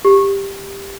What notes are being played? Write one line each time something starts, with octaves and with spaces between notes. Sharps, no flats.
G4